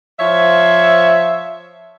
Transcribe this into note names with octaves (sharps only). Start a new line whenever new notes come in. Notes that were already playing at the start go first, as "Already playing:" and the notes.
F3 C5 C#5 E5